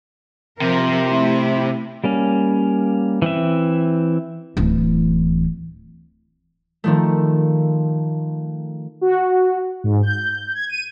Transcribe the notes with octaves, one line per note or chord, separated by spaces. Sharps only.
C3 F3 A#4
A3 E4
G3 A#3 C#4
E3 C4 E5
D1 E3
D#3 F3 A3
F#4
G#2
G6
G#6
D#7